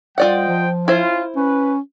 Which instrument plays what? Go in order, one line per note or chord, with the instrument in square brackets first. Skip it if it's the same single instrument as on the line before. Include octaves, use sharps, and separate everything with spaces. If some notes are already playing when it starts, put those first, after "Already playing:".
[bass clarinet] G3 [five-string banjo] F4 D5 F#5 [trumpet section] C5 D#5 G5
[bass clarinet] F3
[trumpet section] C#4 F4 [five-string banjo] E4 C5
[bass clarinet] C#4 [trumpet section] B4